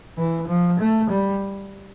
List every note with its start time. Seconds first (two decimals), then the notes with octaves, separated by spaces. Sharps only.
0.17 E3
0.48 F3
0.79 A3
1.10 G3